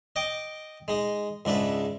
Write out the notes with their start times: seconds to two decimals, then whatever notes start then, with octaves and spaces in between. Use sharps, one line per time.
0.16 D#5 G5 D6
0.88 G#3 D#4
1.45 C#2 G#2 D4 B4 E5